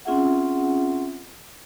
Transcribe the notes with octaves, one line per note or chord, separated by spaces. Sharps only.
C4 C#4 F4 G#4 E5 F#5